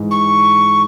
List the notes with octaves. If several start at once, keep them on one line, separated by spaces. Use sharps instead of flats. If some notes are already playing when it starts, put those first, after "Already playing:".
Already playing: G#2 E3 G#3
C#6